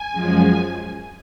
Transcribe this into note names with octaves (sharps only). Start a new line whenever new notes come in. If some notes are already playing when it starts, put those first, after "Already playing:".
Already playing: G#5
F#2 F3 G#3